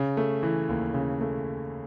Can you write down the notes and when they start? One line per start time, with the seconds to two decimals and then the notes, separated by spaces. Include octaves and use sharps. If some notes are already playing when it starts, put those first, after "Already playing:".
Already playing: C#3
0.17 A3
0.43 E3
0.69 D#2
0.94 C#3
1.21 A3